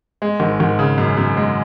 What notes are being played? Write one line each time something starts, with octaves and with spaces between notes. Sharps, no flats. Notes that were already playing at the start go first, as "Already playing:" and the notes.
G#3
G#1
G#1
C#3
F#2
F#2
G#3